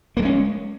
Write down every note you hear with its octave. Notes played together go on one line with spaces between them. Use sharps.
G3 G#3 A#3 C#4